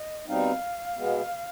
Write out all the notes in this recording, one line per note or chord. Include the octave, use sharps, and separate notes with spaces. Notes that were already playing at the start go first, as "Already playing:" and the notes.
Already playing: D#5
B2 G3 C4 D#4 F5
B2 G#3 B3